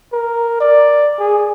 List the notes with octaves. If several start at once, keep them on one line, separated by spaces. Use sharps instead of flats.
A#4
D5
G#4